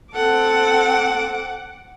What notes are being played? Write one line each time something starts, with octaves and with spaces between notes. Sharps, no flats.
C4 A4 F#5 D6